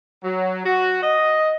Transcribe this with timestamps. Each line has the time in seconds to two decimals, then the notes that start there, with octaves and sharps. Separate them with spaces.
0.24 F#3
0.66 F#4
1.03 D#5